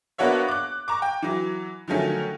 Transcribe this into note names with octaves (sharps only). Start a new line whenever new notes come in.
A#3 B3 D4 F#4 C#5 E5
D6 F#6
A#5 C#6 D6
G5
E3 F#3
D3 D#3 F3 F#3 A3 C#4